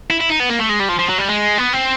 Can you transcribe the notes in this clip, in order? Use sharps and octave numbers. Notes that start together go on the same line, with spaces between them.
E4
E4
D#4
B3
A#3
A3
G#3
G3
F3
F3
F#3
G3
G#3
B3
C4